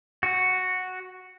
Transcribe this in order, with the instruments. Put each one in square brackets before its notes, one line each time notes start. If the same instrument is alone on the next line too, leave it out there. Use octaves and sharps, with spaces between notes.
[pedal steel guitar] F#4